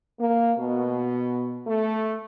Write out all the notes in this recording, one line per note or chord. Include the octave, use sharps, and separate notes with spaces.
A#3
B2
A3